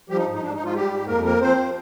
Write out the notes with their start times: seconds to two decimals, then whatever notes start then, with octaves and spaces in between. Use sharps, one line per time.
0.10 F3 G3 G4
0.18 D#4
0.26 G#2
0.34 D#4
0.42 G#2 D4
0.54 D#4
0.59 G#2 F3 F4
0.75 G3 G4
0.91 G#2
1.07 F2 A#3 A#4
1.24 F3 A#3 A#4
1.41 F3 C4 C5
1.57 F3